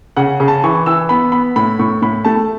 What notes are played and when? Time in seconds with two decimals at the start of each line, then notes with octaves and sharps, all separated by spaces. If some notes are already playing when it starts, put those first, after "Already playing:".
0.16 C#3 F#5
0.40 C#3
0.48 A5
0.64 E3 C#6
0.86 E3 E6
1.09 B3 B5
1.32 B3 B5
1.56 A2 B5
1.79 A2 C#6
2.02 A2 B5
2.25 A3 A5